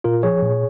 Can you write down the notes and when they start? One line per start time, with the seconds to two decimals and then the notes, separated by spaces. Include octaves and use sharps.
0.04 A#2 F4 A#4
0.23 F3 G#4 C#5
0.42 A#2